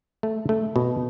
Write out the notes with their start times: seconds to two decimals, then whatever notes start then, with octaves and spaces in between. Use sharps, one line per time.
0.23 A3
0.49 A3
0.76 B2